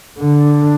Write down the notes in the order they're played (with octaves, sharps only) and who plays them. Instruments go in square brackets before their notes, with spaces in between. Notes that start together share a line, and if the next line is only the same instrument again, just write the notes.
[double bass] D3 [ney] D4